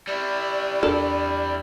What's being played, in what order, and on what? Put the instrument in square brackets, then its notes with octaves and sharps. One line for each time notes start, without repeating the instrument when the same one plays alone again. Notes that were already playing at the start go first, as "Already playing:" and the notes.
[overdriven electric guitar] G3 E4 [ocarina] D5
[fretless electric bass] E2 D4 [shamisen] A4 A#4